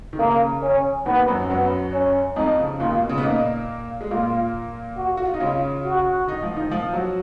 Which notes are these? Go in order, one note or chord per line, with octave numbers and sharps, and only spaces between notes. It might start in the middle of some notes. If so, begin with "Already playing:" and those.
D#3
C#3 A#3
C#4
D#2 D#3 B3
F#2 F#3
F#2 F#3 B3
C#4
F2 F3 D#4
C#3
D#2 D#3 F4
B2
C#3
B3
A#2 A#3 D#4
G#3
A#2 A#3 F4
F#4
F#4
F4
D#4
C#3 C#4 F4
F#4
D#3 D#4
F3 F4
D#3 D#4
F3 F4
F#3 F#4